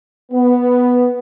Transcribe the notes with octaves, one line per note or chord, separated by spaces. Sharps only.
B3